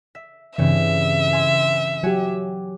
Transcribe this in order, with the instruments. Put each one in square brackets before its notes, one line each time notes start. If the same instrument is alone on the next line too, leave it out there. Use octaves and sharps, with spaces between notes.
[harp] E5
[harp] G2 C#3 C#4 [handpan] E3 C4 [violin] E5
[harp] G#5 C6 E6
[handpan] F#3 G4 [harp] C#5 F#5 G#5